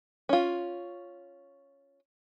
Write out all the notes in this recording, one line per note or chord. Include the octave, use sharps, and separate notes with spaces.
C#4 F4